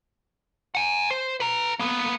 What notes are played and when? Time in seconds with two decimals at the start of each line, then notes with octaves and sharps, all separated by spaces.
0.75 F#5 G#5
1.11 C5
1.40 B4 A#5
1.79 A#3 B3